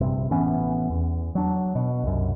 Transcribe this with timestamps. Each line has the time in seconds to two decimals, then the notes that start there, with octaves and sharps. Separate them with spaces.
0.01 A#1 G2 C3
0.31 A1 E3 B3 C#4
0.90 E2
1.35 F#3 D4
1.75 B2
2.03 C2 F#2